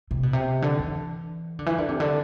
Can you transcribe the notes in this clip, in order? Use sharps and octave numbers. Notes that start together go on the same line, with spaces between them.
C3
B2
C3
D3
E3
D3
E3
D3
C3
D3